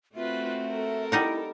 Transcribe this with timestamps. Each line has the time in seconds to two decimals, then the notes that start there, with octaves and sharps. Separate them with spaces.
0.15 A3 C4 F4 F#4 B4 E5
0.70 A4 A#4
1.12 G3 D#4 E4 F#5